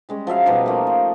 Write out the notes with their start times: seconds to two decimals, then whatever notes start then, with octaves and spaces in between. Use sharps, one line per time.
0.09 G3 G#3 C#4
0.27 F3 F#3 E5 F5
0.46 B2 F3 G3 D#4
0.66 A3 A#3 F4
0.87 C5